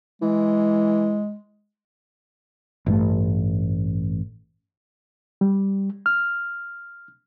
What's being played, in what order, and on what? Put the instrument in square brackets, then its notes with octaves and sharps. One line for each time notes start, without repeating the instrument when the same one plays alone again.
[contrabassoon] E3 [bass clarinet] G#3
[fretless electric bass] A1 G2 A3
[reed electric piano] G3
F6